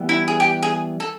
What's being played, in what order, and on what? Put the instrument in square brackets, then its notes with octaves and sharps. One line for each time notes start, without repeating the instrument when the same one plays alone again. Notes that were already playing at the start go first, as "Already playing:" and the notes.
Already playing: [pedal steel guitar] E3 G3 B3
[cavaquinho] E4
G#4
G4
G#4
A4